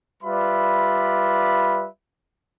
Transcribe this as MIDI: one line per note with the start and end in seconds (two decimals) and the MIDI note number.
0.23 1.87 55
0.23 1.87 65
0.23 1.87 71
0.23 1.87 74
0.23 1.87 76
0.23 1.87 83